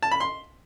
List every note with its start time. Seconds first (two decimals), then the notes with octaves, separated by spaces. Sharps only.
0.03 A5
0.11 B5
0.20 C6